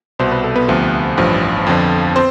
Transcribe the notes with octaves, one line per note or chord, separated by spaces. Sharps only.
C2 B2 C5
B4
A4
B3 B4
D2 C3 F3
A1 G2 F3
F2 D3 F3
C4 C5